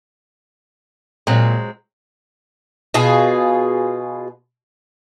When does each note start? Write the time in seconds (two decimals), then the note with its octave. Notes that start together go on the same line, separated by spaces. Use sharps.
1.27 A#2 F#3 G#3 C4
2.94 B2 F4 G#4